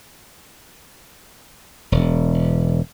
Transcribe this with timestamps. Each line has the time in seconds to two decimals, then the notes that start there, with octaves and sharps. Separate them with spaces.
1.92 E1